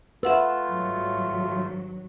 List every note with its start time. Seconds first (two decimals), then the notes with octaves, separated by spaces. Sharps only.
0.23 A3 F4 B4 E5 F#5 E6
0.66 G#1 G2 F#3